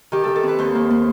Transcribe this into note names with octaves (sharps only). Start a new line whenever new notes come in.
D#3 G4
D#3 A4
A4
C4 B4
D#2 C5
A#3
A#3